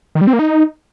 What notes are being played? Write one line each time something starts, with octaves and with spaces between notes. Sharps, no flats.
D#3
G3
C4
A#3
D#4